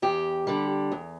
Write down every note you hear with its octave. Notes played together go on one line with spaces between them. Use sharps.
E2 G4
D3 G3
E2